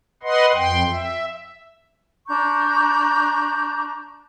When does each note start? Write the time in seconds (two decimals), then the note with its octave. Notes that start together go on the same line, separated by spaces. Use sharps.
0.23 B4 D#5 F#5 C6
0.54 F2 G5 C6
0.91 E5
2.27 D4 A#5 C#6 G6